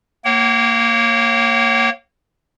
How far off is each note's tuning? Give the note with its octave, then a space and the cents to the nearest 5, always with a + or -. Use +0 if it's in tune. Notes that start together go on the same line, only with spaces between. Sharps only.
A#3 -10 C#5 -20 F#5 +45